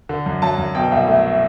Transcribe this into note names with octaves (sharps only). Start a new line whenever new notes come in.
D3
F#2
F#3 A5
F#2
B2 G5
C2
A3